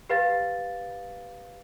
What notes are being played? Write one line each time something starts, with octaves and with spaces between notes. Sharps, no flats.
G4 B4 F5 A6